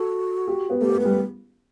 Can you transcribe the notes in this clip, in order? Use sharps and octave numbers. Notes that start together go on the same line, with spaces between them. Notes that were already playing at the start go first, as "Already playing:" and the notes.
Already playing: F#4 A4
G4
B3
A3 G4
B3
A3
B4
G3